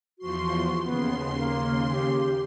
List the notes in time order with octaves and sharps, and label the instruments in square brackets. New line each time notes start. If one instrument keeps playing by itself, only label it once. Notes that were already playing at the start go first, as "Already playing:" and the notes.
[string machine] E2 F3 C6 [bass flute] F#4
[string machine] D#2 C#3 C6 [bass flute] B3
[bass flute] A#3
G4